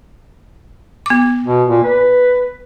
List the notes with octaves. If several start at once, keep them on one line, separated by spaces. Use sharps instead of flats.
B3 D6
B2
A#2
B4